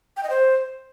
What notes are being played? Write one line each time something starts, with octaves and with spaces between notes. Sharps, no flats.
G5
D#5
C5